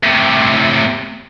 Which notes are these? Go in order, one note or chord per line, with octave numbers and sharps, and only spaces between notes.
A2 C3